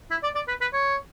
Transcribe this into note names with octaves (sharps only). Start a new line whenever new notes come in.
E4
D5
D5
B4
B4
C#5